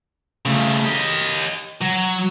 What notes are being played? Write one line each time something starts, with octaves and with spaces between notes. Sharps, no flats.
C#3 A3
G4 D#5
F#3